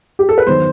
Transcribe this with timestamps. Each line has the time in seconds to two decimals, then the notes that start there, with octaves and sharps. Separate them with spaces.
0.19 G4
0.29 A4
0.38 B4
0.47 E2 D#3 F#3 C5